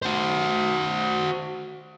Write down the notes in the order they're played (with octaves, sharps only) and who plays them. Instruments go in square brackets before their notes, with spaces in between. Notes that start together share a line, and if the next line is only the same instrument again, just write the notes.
[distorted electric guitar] F#4 C5